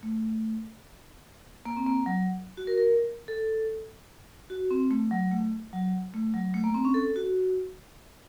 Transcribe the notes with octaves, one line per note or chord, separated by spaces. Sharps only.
A3
A#3
C4
A#3
F#3
F#4
A#4
A#4
A4
F#4
C4
A3
F#3
A3
F#3
A3
F#3
A3
A#3
C4
C#4
A4
F#4